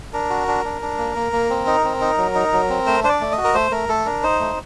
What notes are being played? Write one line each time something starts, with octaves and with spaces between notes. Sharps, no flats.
D4 A#4
F#4
D4
D4
D4
A#3
A#3
A#3
C4
D#4
C4
D#4
F#3
D#4
F#3
C4
A3 C5
D4 C5
D5
A3
D#5
F#4
A#4
A3 C5
A3 A#4
A3 A4
D4 A#4
D#4 C5
A3